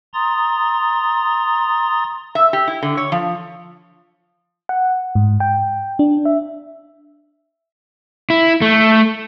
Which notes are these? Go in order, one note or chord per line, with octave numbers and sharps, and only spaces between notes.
A#5 C6 D#6 A6
E5
G4
E4
D3
C#5
F3
F#5
G#2
G5
D4
E5
E4
A3